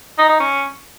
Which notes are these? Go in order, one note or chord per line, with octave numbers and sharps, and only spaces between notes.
D#4
D#4
C#4